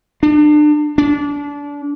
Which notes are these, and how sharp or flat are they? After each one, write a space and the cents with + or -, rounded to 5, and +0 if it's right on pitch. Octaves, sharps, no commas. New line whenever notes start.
D4 +35
D4 -25